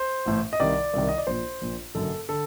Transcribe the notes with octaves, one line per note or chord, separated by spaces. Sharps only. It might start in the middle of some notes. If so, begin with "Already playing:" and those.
Already playing: C5
A1 A2
D#5
C2 C3 D#3 D5
C2 C3 D#3
D#5
D5
A#1 A#2 C5
A#1 A#2
F#1 F#2 D3 A4
D3 A4